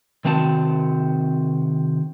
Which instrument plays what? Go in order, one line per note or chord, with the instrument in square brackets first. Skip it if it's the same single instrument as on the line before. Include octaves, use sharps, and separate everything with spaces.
[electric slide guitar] C3 D#3 C4 F#4 A5